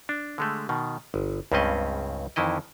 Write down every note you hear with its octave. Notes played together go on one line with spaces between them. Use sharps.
D4
D3 G#3 A3
B2 D#3
G1
C#2 G2 C#3 C4 C#4 D#5
F2 D#3 E3 E4 D#5